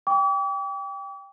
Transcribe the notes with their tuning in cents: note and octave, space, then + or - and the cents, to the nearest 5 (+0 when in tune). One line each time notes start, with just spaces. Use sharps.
G5 +10 D6 -45